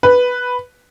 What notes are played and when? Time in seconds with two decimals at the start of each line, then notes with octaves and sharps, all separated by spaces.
0.03 B4